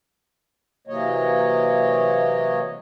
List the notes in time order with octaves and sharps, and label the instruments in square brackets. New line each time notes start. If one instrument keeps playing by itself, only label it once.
[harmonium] C3 E3 F#3 A#3 C#5 D#5